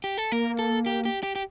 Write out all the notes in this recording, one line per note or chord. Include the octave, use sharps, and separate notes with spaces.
G4
A4
A#3 A#4
A4
G4
G4
G4
G4